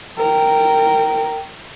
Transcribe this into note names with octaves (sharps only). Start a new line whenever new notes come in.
A#4 G5